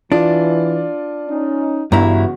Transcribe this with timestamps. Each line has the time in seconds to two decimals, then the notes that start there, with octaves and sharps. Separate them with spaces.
0.12 E3 D4 F4 D5
1.29 C#4 D#4
1.92 G1 G2 C#3 E3 E4 F#4 A#5